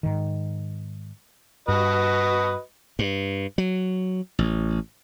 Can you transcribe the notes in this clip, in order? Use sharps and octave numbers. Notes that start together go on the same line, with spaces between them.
G#2 D#3
G2 F#4 B4 D#5
G2
F#3
A1